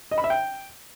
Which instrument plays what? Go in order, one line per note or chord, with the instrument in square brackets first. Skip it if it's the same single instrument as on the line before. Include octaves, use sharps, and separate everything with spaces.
[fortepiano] D#5
B5
E5
G5